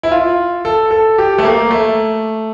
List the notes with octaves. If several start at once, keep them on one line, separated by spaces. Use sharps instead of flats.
E4
F4
A4
A4
G4
A3
A#3
A3